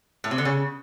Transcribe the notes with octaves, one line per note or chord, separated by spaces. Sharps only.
A2
C3
D3
C#3